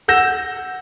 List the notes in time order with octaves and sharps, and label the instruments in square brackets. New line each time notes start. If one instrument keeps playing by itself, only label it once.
[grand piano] F#5 E6 G6 A#6 E7